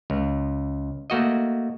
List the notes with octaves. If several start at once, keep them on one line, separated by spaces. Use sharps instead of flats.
C#2
A3 A#3 F#4 D#5